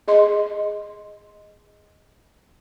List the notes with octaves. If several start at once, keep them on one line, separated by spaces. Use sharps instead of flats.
G#4 D#5 C6